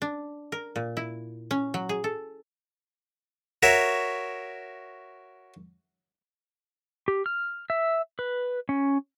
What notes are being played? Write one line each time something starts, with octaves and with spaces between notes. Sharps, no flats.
D4
A#4
A#2
E4
C#4
F#3
G#4
A4
F#4 A#4 C#5 E5
G4
F6
E5
B4
C#4